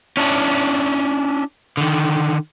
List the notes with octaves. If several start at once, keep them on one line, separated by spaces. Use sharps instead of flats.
C#4 D4 E4
D3 D#3